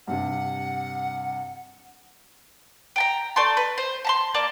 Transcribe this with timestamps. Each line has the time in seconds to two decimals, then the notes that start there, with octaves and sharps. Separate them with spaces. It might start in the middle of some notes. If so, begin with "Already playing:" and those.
0.08 G2 C3 F#5
2.96 G5 A5 A#5
3.36 A3 D5 A5 C6
3.57 B4
3.78 C5
4.05 A5 A#5 C6
4.34 A#3 D5 A5 D6